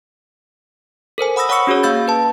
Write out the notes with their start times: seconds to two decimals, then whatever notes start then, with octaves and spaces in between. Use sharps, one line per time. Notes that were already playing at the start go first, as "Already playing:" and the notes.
1.18 A4 A#4 C5 G#5
1.36 F#5 B5 D#6 E6 A#6
1.49 C#5 F#5 B5 C#6 E6 C#7
1.67 C#4 F#4 G#4 C#5
1.83 A#3 F5 E6 G6 A6
2.08 B4 A5